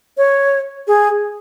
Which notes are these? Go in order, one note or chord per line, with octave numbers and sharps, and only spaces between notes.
C#5
G#4